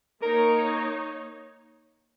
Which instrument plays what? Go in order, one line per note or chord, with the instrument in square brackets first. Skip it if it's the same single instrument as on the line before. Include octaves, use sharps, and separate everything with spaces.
[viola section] A#3 D#4 C#5 [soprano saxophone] A#4